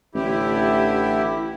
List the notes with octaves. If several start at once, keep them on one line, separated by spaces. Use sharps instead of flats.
A1 D3 E4 G4